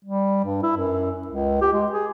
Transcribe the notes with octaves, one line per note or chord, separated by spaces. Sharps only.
G3
G2
E4
F#2
C#2
G4
G#3
G#4